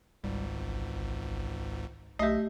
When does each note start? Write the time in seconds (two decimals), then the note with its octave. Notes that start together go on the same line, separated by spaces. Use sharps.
0.24 G#1 C#2 G#2 G3
0.55 A1
2.19 B1 A3 G4 D#5 E5